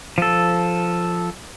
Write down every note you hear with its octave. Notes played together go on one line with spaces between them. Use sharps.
F3 A4